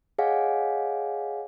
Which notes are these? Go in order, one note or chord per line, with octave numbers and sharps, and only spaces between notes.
G#4 C#5 D#5 F5 F#5 G#5